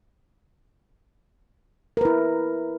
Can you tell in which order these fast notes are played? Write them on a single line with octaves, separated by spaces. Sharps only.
A#4 B4 E4